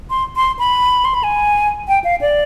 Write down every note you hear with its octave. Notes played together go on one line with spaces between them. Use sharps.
C6
C6
B5
C6
B5
G#5
G5
F5
D5